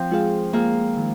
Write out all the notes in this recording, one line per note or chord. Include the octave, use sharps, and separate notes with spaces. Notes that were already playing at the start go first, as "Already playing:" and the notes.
Already playing: F3 C4
G#3 F4 G#4 F5
G#3 A#3 F4 G#4 F5
D#3 G#3